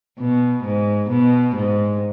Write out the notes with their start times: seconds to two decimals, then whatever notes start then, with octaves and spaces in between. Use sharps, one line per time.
0.19 B2
0.64 G#2
1.10 B2
1.55 G#2